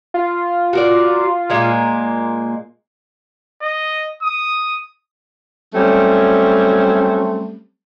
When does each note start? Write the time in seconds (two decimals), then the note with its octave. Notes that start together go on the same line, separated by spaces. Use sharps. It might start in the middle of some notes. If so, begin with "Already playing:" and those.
0.14 F4
0.73 F#4 A#4 D5
1.50 A#2 G#3 A#3
3.62 D#5
4.23 D#6
5.74 F#3 G3 A3 C4 C#4